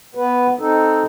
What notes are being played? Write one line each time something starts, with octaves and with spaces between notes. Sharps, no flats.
B3 B4
C4 D#4 A4